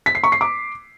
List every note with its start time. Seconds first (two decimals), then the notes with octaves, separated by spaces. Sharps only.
0.06 B6
0.15 C7
0.24 C#6
0.32 C7
0.41 D6